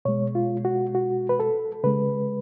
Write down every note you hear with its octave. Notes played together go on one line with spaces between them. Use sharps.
B2 G#3 C#5
F4
F#4
F#4
B4
A4
C#3 G#3 B4